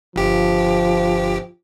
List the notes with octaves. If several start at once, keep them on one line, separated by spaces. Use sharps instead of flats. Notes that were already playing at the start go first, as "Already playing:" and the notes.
G1 F3 G4